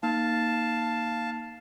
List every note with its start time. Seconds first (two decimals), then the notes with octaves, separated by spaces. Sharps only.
0.03 A#3 D#4 F5 A5